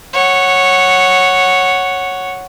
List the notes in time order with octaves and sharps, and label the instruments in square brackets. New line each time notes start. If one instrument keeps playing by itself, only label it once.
[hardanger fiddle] C#5 F#5